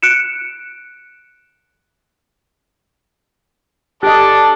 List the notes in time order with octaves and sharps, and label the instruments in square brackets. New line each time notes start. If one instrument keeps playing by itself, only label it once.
[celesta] F#6 C#7 D7 E7
[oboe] D4 [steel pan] G4 D#5 [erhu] A4